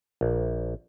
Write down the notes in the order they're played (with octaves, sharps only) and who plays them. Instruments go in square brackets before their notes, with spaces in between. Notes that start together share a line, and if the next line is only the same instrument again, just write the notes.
[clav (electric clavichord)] A#1